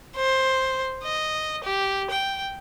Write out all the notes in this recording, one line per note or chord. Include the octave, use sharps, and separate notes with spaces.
C5
D#5
G4
G5